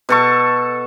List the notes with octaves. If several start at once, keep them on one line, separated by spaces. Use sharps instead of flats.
B2 A4 C#6